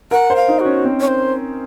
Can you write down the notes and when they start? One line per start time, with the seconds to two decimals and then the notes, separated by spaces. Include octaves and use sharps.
0.11 A#4 F#5
0.30 C5
0.36 F5
0.48 D#4
0.60 F#4
0.65 C#4
0.84 C4
1.00 C#5
1.08 C5